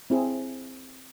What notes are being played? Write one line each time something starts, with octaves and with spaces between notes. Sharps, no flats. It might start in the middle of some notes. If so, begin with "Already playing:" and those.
C4 E4 G#4